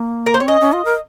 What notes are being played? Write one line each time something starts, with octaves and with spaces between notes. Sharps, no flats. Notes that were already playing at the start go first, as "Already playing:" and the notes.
Already playing: A#3
A#4
C5
C4 C#5
C#4 D#5
C#4
F4
A#4